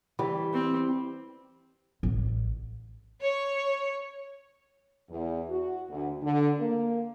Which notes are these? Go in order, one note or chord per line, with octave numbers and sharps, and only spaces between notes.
E3 G3
C4
A1
C#5
E2
F#4
D2
D3
A#3